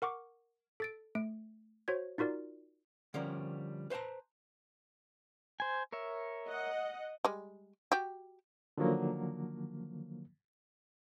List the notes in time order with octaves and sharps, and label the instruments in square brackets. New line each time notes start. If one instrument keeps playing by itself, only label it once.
[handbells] A#4 F#5 C#6 D6
A4 A6 D7
A3 D7
F#4 C5 C#5 G#6
D#4 F4 F#4 A#4 D5
[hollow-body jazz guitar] D3 F3 G3 C#4 A#4
B4 C5 F5 A5 A#5
[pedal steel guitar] C5 G#5
A#4 C#5 E5
[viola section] D#5 F#5
[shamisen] G3 G#3
F#4 G4
[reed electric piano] D3 D#3 F3 F#3 A#3